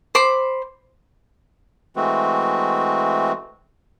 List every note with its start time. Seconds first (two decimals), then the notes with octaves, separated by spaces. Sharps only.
0.15 C5 B5 D6
1.96 E3 G#3 A3 C4 F#4